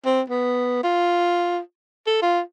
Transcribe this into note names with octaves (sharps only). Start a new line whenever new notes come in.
C4
B3
F4
A4
F4